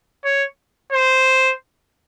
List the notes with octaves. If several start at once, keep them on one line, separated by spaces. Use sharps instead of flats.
C#5
C5